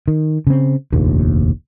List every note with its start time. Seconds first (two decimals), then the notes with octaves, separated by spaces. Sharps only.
0.08 D#3
0.47 C#3 C4
0.93 F1 A#1 D#2